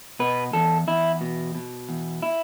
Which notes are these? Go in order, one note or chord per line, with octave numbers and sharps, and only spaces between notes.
B2 B4
E2 A4
E2 E4
B2
B2
E2
E4